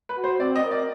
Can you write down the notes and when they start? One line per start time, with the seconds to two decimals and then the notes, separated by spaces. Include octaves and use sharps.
0.09 B4
0.16 F#4
0.24 C5
0.40 C4 D5
0.56 D#5
0.64 A#4
0.71 D5